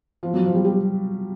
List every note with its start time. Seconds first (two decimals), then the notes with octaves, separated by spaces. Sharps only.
0.23 F3
0.34 F#3
0.44 F3
0.54 G3
0.65 G3